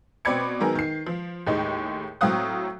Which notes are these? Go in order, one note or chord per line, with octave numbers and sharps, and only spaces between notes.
B2 C4 D5 B5 G#6 C#7
D#3 F#3 B3 G#4 A#4
D#3 C7
F3
D#2 A2 G#3 D#4
A2 F#3 C4 F5 D#6 F#6